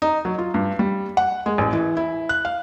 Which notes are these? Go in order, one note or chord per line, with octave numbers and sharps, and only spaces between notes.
D#4
F#3
F4
G2
G3
F#5
G#3
A1
E3
E4
F#6
F5